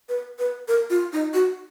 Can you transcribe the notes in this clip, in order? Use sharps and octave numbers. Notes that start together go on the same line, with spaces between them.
B4
B4
A#4
F4
D#4
F#4